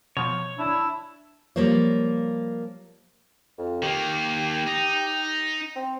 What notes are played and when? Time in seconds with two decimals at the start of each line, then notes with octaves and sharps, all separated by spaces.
0.17 B2 F3 C#5
0.59 D4 E4
1.56 F3 G3 A#3 C5 C#5
3.58 F2
3.83 D#3 A#3 G4
4.67 D#4
5.76 C4